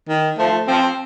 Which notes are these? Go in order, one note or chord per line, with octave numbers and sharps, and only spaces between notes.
D#3
F3 A3
F3 C4